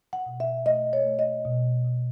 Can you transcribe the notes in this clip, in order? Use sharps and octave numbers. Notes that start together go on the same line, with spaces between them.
F#5
B2
E5
A3 D#5
C#5
A3
D#5
B2
B2